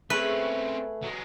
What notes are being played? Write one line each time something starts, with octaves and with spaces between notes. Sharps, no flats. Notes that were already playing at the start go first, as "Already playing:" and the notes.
A3 C4 C#4 G#4 B4
F#3 G#3